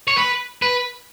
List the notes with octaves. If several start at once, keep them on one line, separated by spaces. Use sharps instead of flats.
C#5
B4
B4